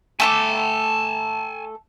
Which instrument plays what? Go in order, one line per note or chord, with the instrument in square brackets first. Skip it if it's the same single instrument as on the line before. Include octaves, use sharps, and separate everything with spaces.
[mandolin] A3 A4 D6 [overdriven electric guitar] G#5 A5